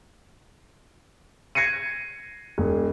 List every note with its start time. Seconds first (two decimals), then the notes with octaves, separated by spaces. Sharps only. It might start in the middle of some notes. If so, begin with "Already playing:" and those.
1.55 G#6 A#6 C7 C#7 D#7
2.58 E1